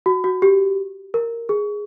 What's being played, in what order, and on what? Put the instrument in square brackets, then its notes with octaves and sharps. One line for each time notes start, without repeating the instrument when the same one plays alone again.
[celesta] F#4
F#4
G4
A#4
G#4